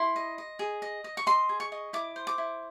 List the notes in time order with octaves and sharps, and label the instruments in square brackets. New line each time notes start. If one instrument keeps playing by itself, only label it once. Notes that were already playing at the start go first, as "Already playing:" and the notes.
Already playing: [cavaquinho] E4 C6
D#5
D#5
G#4
D#5
D#5
C#6
D#5 C6
G#4
C#6
D#5
E4 D6
C5
D6
E4